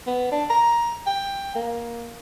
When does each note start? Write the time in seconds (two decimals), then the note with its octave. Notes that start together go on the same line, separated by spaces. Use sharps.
0.07 B3
0.32 D4
0.50 A#5
1.07 G5
1.55 A#3